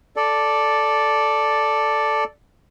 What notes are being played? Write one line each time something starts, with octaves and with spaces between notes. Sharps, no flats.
A4 D5